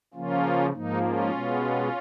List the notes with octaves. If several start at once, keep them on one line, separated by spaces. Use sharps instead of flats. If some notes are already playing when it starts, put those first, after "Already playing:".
C#3 F3 A#3 C#4 F4
G#2 F3 A#3 D#4
C#4 F4
B2 G#3 B3